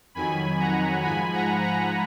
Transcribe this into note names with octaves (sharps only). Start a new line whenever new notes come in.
F2 D#3 F#3 G#5 B5
F#5 A#5
G#2 F3 G#5 B5
F#5 A#5
F#5 A#5